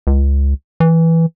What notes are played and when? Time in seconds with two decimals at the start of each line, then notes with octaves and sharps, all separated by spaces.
0.07 C#2
0.80 E3